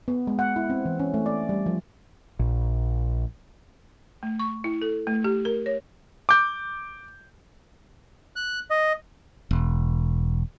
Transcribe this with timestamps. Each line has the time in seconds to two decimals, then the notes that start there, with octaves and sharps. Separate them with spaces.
0.08 B3
0.27 G#3
0.39 F#5
0.56 E4
0.70 C4
0.85 E3
0.99 C#4
1.14 A3
1.26 D5
1.49 G3
1.66 F3
2.39 A#1
4.23 A3
4.39 C#6
4.64 E4
4.82 A4
5.07 A3
5.24 G4
5.45 A#4
5.66 C#5
6.29 D6 G6
8.36 F#6
8.70 D#5
9.51 E1